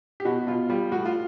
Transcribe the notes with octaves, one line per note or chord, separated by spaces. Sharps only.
G4
B2 F#4
B2 F4
G3 F4
A2 F#4
F4